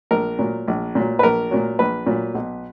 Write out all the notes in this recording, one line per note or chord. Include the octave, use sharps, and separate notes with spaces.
A#1 A#4
A#2 F#3
A#1
A#2 F#3
B4
A#1 A#4
A#2 F#3
A#1 B4
A#2 F#3
B1